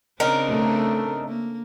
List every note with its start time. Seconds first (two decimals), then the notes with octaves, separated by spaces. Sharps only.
0.20 C#3 C4 D4 D#4 A#4
0.51 A3
1.28 A#3